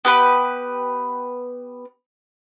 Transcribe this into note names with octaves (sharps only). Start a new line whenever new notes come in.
B3 G4 B4